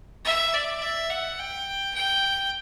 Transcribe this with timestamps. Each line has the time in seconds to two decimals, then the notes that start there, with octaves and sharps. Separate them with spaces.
0.25 E5
0.54 D5
0.82 E5
1.10 F#5
1.39 G5
1.95 G5